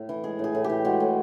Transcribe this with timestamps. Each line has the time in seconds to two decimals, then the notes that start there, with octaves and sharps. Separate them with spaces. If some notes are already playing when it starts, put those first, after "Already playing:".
Already playing: A2
0.09 E3
0.24 G#3 G#4
0.39 A2 G#4
0.55 A2
0.64 G4
0.70 E3
0.85 G#3 F#4
1.00 A2